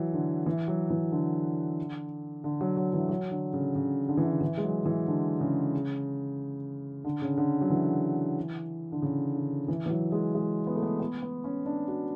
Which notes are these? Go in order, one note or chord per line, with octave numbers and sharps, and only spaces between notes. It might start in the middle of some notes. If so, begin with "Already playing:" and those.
Already playing: E3 F#3
D3
E3
F#3
E3
D3
D3
F#3
F#3
E3
F#3
D3
C#3
C#3
D3
E3
D3
E3
G#3
F#3
E3
D3
C#3
D3
C#3
D3
F#3
E3
D3
C#3
D3
E3
E3
F#3
G#3
G#3
B3
A3
B3
B3
B3
C#4
D4
F#4